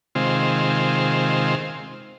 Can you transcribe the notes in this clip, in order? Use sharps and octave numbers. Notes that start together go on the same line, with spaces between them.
C3 D#3 G#3 C4 F4